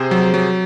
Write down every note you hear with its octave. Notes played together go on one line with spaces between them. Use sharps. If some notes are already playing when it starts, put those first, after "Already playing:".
Already playing: C3 G#4 C5
F#3
F#3